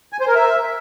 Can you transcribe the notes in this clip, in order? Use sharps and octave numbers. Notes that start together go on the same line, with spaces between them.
G#5
C5
A#4
E5